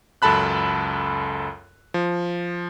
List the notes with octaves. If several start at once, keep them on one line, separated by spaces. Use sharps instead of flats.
C#2 F#2 A4 A5 B5 F#6
F3